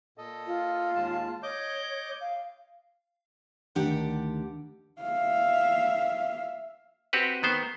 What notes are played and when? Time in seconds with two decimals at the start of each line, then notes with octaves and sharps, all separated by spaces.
0.18 A#2 A4 D#5
0.47 F4
0.95 D#2 G#3 A5
1.43 C#5 D#5 D6 G6
2.21 F5
3.75 D2 D#3 D4 G4 F#5 G5
5.01 E5 F5
7.13 C4 F#4 G4 B4
7.43 D#3 B3 C5